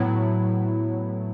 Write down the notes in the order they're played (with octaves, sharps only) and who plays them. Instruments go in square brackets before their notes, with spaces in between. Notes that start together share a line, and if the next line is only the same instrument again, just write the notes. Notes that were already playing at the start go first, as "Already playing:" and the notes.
Already playing: [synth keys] A2 F#3 B3 E4